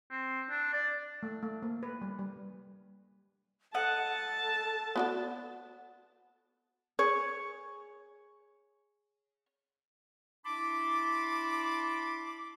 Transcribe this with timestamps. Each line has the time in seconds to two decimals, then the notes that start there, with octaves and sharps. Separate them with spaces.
0.11 C4
0.50 D4
0.73 D5
1.23 A3
1.43 A3
1.62 A#3
1.83 B4
2.02 G3
2.19 G3
3.74 A4 D#5 F#5 A5
4.96 B3 F#4 D5
6.99 G#4 C#5
10.45 D4 E4 A5 B5 C6 D6